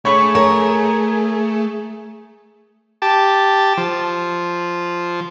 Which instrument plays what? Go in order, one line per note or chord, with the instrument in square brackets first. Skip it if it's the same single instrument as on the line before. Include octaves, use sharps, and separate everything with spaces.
[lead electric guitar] A3 [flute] G#4 [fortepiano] C#5 B5 C#6
[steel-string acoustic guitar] A#4 [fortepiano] C#5
[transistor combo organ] G4 A5
F3